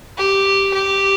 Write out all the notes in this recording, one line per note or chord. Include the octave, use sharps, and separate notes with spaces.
G4
G4